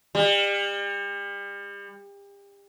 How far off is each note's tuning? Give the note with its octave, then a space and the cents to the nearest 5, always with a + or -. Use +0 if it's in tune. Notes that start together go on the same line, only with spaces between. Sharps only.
G3 +35